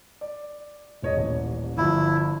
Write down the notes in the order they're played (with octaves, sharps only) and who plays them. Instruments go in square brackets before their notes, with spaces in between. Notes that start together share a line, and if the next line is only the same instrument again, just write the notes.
[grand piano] D5
E1 C#5 D#5
D#1 A1
[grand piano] G1 F3 [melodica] E4